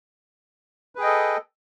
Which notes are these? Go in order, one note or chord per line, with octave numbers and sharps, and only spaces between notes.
G#4 A4 B4 D#5 G5